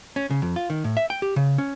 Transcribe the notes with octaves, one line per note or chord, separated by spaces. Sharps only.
C#4
C#3
F2
F4
D#3
A2
E5
G5
G4
C#3
C#4